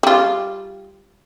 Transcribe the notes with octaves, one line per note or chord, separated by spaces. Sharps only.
G3 F4